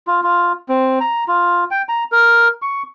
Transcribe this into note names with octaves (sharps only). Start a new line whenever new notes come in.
F4
F4
C4
A#5
F4
G5
A#5
A#4
C#6